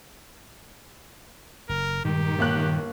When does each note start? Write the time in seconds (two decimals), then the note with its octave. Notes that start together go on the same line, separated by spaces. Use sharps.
1.69 F#1 A#4
2.05 G2 A#2 D#3 G#3 G4
2.38 G1 D#3 A#3 F#6